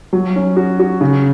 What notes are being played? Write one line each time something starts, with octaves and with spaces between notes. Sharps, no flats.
F#3
C#4
F#4
F#4
C#3